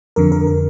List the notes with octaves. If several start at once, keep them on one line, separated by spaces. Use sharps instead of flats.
F2 D3 A#4
A#4
A#4